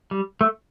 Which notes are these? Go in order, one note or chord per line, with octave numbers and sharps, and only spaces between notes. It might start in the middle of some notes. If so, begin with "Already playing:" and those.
G3
A3